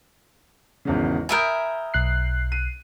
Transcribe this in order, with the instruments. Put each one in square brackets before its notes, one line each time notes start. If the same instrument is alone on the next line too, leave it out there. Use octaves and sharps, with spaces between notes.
[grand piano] G#1 E2 C#3
[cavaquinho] A#4 E5 G#5 [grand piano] B5 D#6 G6
[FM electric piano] B1 F#6 C7
[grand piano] D#7